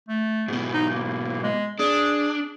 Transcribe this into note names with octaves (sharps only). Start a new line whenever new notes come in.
A3
G#2 B2
D#4
A#3
G#3
D4 G#4